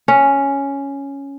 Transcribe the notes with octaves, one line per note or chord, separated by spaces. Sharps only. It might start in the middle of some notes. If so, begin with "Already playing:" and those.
C#4